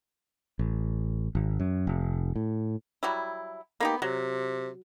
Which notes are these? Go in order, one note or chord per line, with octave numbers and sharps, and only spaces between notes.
A1
G#1
F#2
F1
A2
F#3 G3 E4
A#3 B3 D#4 G4
C3 F#3